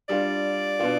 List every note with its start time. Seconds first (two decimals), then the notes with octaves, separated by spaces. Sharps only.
0.09 G3 D4 F4 D5
0.79 B2 B3 D4 F4